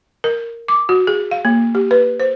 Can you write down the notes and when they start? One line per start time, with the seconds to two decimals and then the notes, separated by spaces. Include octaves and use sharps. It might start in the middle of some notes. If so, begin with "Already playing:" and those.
0.24 A#4
0.68 D6
0.89 F#4
1.07 G#4
1.31 F5
1.45 A#3
1.75 G4
1.91 B4
2.20 C5